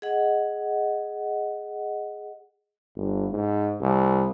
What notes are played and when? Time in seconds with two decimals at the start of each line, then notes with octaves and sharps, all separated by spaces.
0.02 G#4 D#5 F#5
2.96 G1
3.31 G#2
3.80 C2